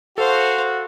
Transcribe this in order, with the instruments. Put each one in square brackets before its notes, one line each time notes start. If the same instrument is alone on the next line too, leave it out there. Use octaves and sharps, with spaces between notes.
[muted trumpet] F#4 [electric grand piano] A4 [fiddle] C5 F5